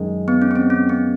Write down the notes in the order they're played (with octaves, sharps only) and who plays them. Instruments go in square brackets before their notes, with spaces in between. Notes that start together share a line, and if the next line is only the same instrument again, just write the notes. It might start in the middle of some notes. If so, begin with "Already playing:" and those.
Already playing: [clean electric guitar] F#2 D#3 G#3
[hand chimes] B3
C#4
B3
C4
C#4
B3